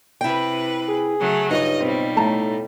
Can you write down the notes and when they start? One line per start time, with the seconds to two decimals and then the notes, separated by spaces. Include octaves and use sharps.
0.21 C3 E4 B4 G5
0.88 G#4
1.19 C#3 F#3 A3
1.51 G2 D#4 F4 C#5 D#5
1.80 B2 G3 C4
2.17 A2 A3 A5 A#5